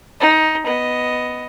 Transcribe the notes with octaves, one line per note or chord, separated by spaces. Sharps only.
D#4
B3 D#5